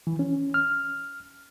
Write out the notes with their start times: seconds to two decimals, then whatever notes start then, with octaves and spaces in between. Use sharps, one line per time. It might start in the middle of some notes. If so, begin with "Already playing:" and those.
0.07 E3
0.19 C#4
0.54 F6